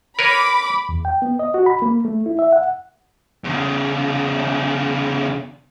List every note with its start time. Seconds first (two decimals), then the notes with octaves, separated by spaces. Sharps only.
0.19 A#4 B4 C#5 B5 D6
0.89 E2
1.05 G5
1.22 B3
1.39 D#5
1.54 F#4
1.66 B5
1.82 A#3
2.05 A3
2.26 E4
2.39 E5
2.53 F#5
3.44 E2 C#3